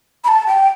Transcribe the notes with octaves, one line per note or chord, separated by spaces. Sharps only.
B5
A5
G5